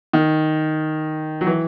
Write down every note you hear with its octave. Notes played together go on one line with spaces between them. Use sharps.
D#3
F#3
E3